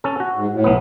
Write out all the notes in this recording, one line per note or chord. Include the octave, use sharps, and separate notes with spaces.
C#4 A4
F#4
G#2
A2
B1 B3